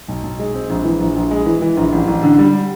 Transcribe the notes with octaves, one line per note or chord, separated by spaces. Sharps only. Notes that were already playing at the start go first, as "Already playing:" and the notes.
B1
B1
G#3
C4
A#1
E3
A#1
A#1
G#3
E3
E3
A#1
A1
A1
D3
G3